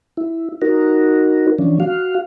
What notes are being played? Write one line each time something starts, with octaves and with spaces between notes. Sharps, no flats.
E4
D#4 F#4 A#4
E3 F3 C#4 D4
F#4 F5